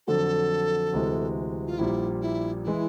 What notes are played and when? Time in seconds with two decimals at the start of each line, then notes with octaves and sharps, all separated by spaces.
0.07 F2 D3 F#3 A4
0.93 D2 C3 E3 G#3
1.67 F4
1.78 A#1 A#2 G3 E4
2.21 E4
2.64 E3 G#3 E4